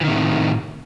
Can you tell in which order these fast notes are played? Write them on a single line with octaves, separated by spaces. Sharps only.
E3 D#3 C3 A2